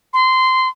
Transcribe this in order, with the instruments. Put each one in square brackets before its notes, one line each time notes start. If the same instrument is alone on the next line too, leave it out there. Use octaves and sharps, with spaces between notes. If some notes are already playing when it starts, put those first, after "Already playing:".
[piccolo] C6